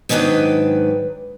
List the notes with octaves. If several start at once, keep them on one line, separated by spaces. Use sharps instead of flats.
G#2 D#3 F#3 D4 B4 G5